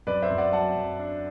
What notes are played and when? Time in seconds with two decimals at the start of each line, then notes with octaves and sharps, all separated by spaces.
0.07 F#2 B4 D5
0.22 C5 E5
0.30 F#2
0.38 D5 F#5
0.53 F#3 F#5 A5
0.76 F#2
0.99 D4